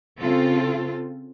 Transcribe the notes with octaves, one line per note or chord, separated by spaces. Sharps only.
C#3 C4 F4 A4